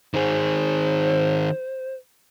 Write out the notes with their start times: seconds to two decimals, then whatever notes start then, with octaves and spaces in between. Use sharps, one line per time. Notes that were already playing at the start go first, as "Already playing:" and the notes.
0.14 D#3 G#4 C5